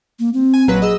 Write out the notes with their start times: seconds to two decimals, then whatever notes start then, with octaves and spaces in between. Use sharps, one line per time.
0.19 A#3
0.34 C4
0.54 G#5
0.68 A#1 F#3 B4
0.82 G#4 D#5 E6